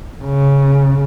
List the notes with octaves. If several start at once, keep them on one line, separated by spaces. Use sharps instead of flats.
C#3